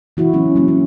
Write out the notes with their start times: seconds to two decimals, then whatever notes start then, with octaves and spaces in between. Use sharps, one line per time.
0.17 E3 E4 F#4
0.33 D3 E3 F#3 B3 C#4
0.56 F#3 A#3 C#4
0.68 C#4